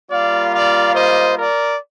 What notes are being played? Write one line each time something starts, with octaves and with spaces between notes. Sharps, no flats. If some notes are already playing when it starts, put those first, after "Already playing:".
G3 A#3 F4 D5 F5
D5 F5
C5 D#5
A#4 D5